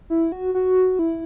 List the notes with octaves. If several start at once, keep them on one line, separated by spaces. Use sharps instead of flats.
E4
F#4
F#4
E4